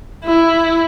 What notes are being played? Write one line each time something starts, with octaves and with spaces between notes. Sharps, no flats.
E4